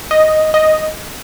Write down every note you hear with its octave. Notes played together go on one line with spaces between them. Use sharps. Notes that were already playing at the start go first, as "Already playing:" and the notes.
D#5
D#5